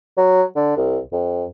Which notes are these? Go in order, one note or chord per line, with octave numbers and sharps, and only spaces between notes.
F#3
D3
C2
F2